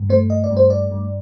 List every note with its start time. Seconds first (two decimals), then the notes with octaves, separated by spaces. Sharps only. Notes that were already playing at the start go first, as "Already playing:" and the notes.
Already playing: G2
0.09 A3 C5
0.30 D#5
0.44 D5
0.51 G2
0.57 C5
0.70 D5
0.91 G2